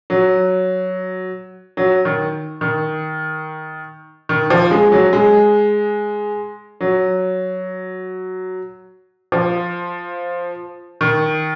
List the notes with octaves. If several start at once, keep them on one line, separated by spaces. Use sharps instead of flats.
F#3
F#3
D#3
D#3
D#3
F3
G#3
F#3
G#3
F#3
F3
D#3